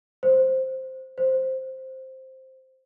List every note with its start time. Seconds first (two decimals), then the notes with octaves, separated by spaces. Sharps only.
0.23 C5
1.18 C5